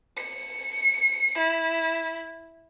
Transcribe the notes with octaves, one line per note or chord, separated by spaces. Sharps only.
C#7
E4